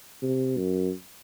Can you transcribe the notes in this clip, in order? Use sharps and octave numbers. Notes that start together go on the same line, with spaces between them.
C3
F#2